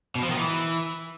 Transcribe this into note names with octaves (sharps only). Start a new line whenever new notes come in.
B2
F3
D#3
E3